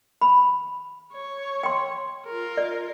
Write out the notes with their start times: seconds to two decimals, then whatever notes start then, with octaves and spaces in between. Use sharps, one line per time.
0.21 B5
1.13 C#5
1.63 G5 C6
2.26 F4 A#4
2.57 D5